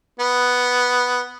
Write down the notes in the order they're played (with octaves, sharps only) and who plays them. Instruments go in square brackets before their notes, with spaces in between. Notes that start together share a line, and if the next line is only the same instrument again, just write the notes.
[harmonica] B3